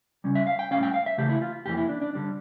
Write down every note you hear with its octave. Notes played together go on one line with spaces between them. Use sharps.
C#3 G3 C#4
E5
F5
G5
A2 G3 C#4 F5
G5
F5
E5
C#3 E3 A3 G4
E4
F4
F2 E3 G3 A#3 G4
E4
D4
D4
D3 G3 D4